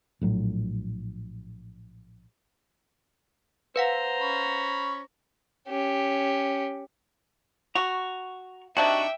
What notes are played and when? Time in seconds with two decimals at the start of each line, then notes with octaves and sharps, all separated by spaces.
0.21 A#1 A2 F#3
3.76 B4 C5 F5 F#5 A#5
4.21 C#4 B5 C#6
5.68 C#4 G4
7.75 F#4 A#5 C#6
8.77 C3 D4 D#4 F#4 E5 G5